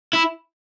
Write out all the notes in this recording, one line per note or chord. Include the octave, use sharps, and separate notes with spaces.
E4